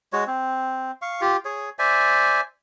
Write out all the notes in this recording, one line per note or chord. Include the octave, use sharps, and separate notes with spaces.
G#3 F#4 C#5
C4
F5 C#6
F4 G4
G#4 C#5
C5 D5 E5 G#5